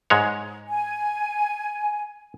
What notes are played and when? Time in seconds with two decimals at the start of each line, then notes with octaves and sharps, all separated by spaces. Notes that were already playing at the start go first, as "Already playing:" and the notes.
0.10 G#2 G#3 C#5
0.69 G#5